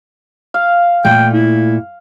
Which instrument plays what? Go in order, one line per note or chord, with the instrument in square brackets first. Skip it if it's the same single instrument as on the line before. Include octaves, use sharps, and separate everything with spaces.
[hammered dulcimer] F5
[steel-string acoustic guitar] A#2 A3 [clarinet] G5
[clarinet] E4